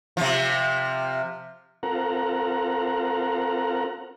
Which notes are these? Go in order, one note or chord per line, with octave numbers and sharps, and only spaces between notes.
C3 F3
C4 F4 A4 A#4 F#5 A#5